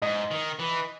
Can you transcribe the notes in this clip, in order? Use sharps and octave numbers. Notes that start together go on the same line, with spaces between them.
G#2 D#5
D#3
E3